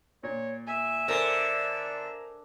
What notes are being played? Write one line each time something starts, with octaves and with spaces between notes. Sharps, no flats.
A#2 C#5
E5 G#5
D3 A#4 C5 D5 G#5